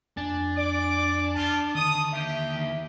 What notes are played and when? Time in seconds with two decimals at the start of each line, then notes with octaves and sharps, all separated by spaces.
0.17 F2 D4 G#5 A6
0.57 D5 D6
1.34 A3 F4 A5
1.75 D#2 D3 D#3 D#6
2.13 A#3 G4 E5